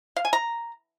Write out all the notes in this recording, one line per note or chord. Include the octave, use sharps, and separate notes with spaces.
F5
G#5
A#5